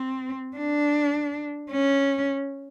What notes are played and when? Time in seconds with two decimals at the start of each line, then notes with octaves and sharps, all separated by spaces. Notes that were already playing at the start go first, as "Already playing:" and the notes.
Already playing: C4
0.57 D4
1.71 C#4